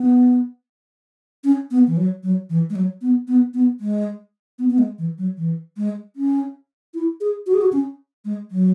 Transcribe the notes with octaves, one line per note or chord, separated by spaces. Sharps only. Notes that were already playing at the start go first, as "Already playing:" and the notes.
Already playing: B3
C#4
B3
E3
F#3
F#3
E3
G#3
F#3
B3
B3
B3
G#3
B3
B3
G#3
E3
F#3
E3
G#3
C#4
E4
G#4
F#4
G#4
F#4
C#4
G#3
F#3